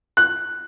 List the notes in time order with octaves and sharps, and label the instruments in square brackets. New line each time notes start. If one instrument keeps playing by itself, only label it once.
[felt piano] F#6